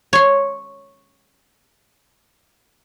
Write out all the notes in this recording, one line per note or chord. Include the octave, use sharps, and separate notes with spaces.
C#5 C6